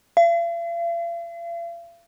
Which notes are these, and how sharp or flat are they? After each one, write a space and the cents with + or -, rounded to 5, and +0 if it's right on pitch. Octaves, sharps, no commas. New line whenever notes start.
F5 -45